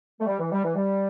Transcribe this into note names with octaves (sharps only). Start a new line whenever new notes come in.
A3
G3
E3
G3
E3
G3